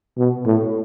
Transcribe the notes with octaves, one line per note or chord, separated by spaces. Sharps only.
B2
A2